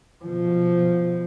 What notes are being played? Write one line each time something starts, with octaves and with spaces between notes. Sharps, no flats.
B2 F3